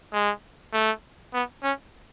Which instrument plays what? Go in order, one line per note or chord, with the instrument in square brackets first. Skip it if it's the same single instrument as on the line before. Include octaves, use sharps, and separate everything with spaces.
[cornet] G#3
A3
B3
C#4